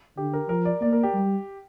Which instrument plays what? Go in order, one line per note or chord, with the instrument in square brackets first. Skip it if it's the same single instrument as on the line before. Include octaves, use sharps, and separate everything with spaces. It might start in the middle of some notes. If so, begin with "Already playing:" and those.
[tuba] D3 [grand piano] G4
[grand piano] A#4
[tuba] F3 [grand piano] A#4
[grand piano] D5
[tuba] A#3 [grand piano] D5
[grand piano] A#4
G4
[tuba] G3